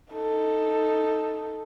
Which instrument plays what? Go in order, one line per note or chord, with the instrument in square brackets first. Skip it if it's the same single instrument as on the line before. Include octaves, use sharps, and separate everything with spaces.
[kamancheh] D#4 A4